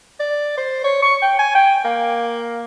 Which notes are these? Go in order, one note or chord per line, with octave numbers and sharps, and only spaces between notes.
D5
C5
C#5
C#6
G5
G#5
G5
A#3